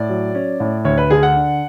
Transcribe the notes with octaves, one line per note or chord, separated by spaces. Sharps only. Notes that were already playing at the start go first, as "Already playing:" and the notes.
Already playing: A2 D5
F#3
C#4
A2
D2 C#5
B4
D3 G#4
F#5
D4